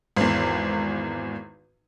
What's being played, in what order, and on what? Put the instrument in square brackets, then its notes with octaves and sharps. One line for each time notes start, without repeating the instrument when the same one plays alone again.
[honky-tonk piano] G#1 E2